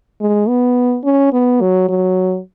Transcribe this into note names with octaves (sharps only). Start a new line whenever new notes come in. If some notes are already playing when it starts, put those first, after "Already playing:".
G#3
B3
C#4
B3
F#3
F#3